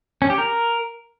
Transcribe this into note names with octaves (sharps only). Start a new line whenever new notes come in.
C#4
G4
A#4